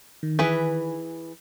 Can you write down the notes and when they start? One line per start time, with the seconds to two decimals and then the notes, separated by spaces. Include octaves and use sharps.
0.23 D#3
0.39 E3 G#4 B4